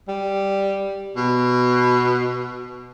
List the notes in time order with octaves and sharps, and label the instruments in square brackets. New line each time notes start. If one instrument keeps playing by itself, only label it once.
[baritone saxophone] G3
B2